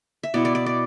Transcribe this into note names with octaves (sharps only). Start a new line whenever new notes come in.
E5
B2 B3 E4 D5
D5
D5
D5